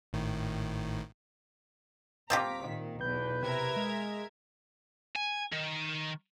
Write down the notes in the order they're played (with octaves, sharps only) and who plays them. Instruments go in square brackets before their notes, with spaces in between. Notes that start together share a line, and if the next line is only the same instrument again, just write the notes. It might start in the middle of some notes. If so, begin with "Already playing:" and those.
[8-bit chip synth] G#1 A2 D#3
[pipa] C4 F4 G4 [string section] A#5 D6 B6
[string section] A#2 D#3
[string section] B1 E2 [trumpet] B4 [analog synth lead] G6
[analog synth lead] C3 [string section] A#4 E5 G#6
[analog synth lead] G#3
[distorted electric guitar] G#5
D#3